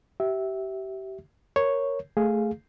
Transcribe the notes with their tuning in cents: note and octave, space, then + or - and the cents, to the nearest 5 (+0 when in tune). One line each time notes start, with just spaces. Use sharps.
G4 -30 E5 -10
A#4 +0 C#5 +0
A3 +0 G#4 +0 F5 +0